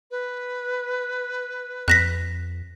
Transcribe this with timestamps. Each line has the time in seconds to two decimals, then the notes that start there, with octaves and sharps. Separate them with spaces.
0.11 B4
1.88 F2 F#6 A#6 B6